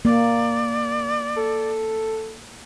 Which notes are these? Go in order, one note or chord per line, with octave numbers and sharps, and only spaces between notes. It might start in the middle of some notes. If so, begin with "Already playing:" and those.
A#3 D5
A4